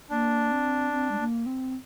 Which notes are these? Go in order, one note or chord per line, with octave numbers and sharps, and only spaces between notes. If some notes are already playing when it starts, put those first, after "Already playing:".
A#3 D4
C4
C4
G#3
A#3
C4